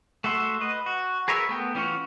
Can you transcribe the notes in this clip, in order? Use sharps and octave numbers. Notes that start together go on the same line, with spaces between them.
A3 F#4 E5 C6
B4 D#5
F#4
G#4 A#4 B4 C#5 E5
A3 B3 G5
E3 C#4 F4 F#4 C#5